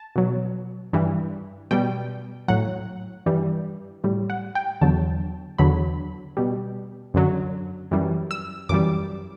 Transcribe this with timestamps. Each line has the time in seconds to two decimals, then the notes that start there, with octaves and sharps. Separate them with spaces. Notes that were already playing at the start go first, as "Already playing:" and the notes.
Already playing: A5
0.16 B2 F#3
0.93 G2 E3 G3
1.71 B2 G3 G5
2.48 A2 F#3 F#5
3.26 G2 E3 G3
4.04 A2 G3
4.30 F#5
4.55 G5
4.81 E2 D3 F#3 A5
5.58 E2 D3 F#3 B5
6.37 B2 G3
7.14 F#2 D3 F#3
7.91 F#2 E3 G3
8.31 E6
8.69 F#2 E3 G3 D6